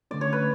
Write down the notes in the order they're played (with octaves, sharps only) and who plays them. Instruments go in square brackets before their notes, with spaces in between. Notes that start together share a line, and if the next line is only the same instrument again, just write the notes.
[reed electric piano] D3 A3 C#4 [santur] D5
[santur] C#5
B4